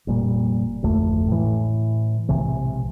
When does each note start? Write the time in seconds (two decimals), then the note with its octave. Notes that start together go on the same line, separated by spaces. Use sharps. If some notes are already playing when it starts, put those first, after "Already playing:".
0.07 F1 A#2 G3
0.82 D1 G#1 F2 A3
1.28 A2 E3
2.29 B1 G#2 C3 E3